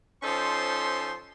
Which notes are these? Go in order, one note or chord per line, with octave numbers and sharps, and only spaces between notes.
F3 C#4 D#4 A4 C5 C6